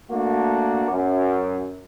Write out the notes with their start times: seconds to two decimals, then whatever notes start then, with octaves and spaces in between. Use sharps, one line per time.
0.11 A3 A#3 D4 F#4
0.90 F#2